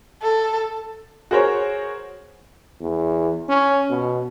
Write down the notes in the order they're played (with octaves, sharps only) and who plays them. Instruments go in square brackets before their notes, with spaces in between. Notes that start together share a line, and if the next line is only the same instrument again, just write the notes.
[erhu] A4
[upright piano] F#4 G#4 A#4 C5 C#5
[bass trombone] E2
C#4
B2